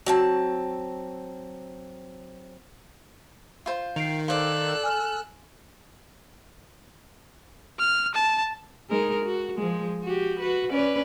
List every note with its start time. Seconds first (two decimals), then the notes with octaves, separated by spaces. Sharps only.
0.06 F#3 C4 A5
3.66 F4 C5
3.96 D#3 C7 D7 F7
4.28 A4 C5 D5 F5 E6 F#6
4.83 G#5 F6
7.79 F6
8.14 A5
8.89 G#3 D#4 A#4
9.25 F#4
9.57 F3 G#3
10.03 F#4 G4
10.40 F#4 B4
10.70 C#4 B4 D5